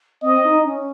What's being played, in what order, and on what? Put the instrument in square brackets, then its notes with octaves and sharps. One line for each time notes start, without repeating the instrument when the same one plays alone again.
[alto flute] C4 [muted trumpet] D#5
[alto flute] D#4
C#4